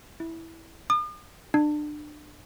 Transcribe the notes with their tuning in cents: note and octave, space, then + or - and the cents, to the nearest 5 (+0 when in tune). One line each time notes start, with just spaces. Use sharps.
E4 -5
D#6 -45
D4 +30